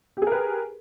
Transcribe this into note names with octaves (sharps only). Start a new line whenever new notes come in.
G4 G#4 A#4 B4